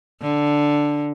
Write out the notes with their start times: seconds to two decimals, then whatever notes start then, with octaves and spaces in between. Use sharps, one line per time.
0.21 D3